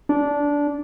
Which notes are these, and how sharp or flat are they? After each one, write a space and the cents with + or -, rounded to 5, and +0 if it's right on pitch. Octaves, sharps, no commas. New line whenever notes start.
D4 -15